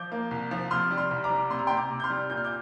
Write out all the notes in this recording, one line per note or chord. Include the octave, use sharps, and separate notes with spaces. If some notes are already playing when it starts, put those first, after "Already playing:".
Already playing: F3 D6 G6
A#3
C2
F3
C3 C6 F6
G3
C6 F6
C2
A#5 D6
G3
C3 C6
A#5
G5 C6
C3
A#5 D6
C3
G6
C6 F6
G3
A#2 G6
F6
D6 G6